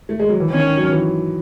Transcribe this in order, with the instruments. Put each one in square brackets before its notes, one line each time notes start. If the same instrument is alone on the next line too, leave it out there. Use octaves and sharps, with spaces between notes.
[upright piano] A3
G#3
F#3
E3
[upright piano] D#3 [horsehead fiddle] C#4
[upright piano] D#3
F#3
E3